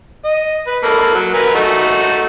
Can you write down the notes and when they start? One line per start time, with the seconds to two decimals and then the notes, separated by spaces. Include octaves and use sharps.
0.25 D#5
0.67 B4
0.83 A#3 A4 B5
1.14 F#3
1.34 A#4 B4 G#5
1.55 A3 D#4 F#4